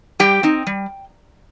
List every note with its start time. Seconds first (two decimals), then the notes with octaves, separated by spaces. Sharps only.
0.19 G3 G4 G5
0.43 C4 D#4
0.67 G3